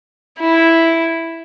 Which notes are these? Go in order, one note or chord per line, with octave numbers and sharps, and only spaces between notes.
E4